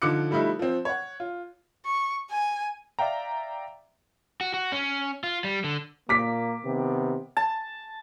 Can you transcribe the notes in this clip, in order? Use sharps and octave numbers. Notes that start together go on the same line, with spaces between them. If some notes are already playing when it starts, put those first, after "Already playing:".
D3 F3 D#4 D6 F#6 C#7
F3 G3 A3 D#4 E4
F3 C4
C#5 F#5
F4
C#6
G#5
D5 E5 F5 G5 A#5
F#4
F#4
C#4
F4
G3
D3
A#2 A#3 D6 B6
C3 D#3 B3
A5